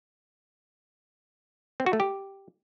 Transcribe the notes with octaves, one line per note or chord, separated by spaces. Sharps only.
C4
F#4
A3
G4